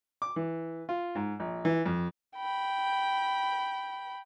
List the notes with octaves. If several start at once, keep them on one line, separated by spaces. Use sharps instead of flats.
D6
E3
F4
G#2
A#1
E3
F2
G5 B5